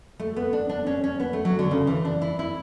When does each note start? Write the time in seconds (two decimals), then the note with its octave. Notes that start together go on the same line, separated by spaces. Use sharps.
0.20 A3
0.36 B3
0.53 D4
0.69 D4
0.86 C#4
1.04 C#4
1.20 B3
1.33 A3
1.45 F#3
1.59 D3
1.71 C#3
1.87 E3
2.05 D4
2.22 E4
2.39 E4